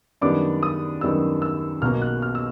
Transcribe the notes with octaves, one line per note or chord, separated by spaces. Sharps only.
F#2 D#3 G3 B3 D4 D6
D#6
F#2 D#3 G3 B3 D4 E6
E6
B1 B2 F#3 A#3 F6
F#6
F6
E6